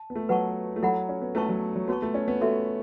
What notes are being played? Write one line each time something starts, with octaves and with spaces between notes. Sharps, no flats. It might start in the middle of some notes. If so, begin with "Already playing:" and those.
Already playing: A5
B3
A3
F#3 B4 F#5 A5 C#6
A3
F#3 E4 A4 F#5 B5
C#4
B3
A3 C#4 E4 B4 A5 C#6
F#3
F#3
B3 F#4 C#5 A5 C#6
A3
C#4
B3
A3 F#4 A4 E5